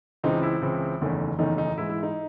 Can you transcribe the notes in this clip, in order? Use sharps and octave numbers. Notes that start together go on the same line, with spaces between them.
C#2 C#3 E3 C4 D#4
E4
C#2 C#3 E3 C4
F#1 E2 D#3 A3 C#4
F#1 E2 D#3 A3 C#4 D#4
D#4
G#2 E3 G#3 E4
E4
D#4